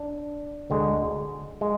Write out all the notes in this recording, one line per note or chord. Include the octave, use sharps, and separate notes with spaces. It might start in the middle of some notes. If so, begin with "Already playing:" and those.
Already playing: D4
D2 D3 G#3
G#3